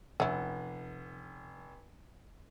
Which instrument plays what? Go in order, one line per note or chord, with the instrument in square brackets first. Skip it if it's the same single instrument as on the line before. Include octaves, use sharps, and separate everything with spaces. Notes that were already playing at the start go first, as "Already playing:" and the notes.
[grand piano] F1 F#5 [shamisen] C#4 E4